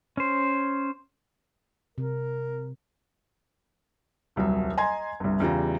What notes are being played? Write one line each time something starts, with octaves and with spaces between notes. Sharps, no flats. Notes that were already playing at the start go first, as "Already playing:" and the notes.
C#4 C5
C3 A#4
D#1 C2 F#3 E5
D#5 G#5 A#5 C6 G#6
G1 C2
E2 C#3 G3 F4 A#5